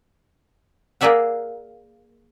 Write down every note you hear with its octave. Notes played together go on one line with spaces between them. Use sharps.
A#3 G#4 A#4 D5 E5 F#5